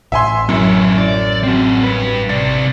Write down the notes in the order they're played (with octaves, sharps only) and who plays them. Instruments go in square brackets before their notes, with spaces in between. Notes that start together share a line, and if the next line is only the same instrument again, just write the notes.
[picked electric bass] A1 [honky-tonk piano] E5 G#5 C6
[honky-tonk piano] F#2 [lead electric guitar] F#3 E4
[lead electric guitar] D5
C4 F#4
G3 B4
[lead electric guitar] C3 D5 [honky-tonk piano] A6